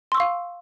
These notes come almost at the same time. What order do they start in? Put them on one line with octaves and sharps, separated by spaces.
C6 E6 C#6 F5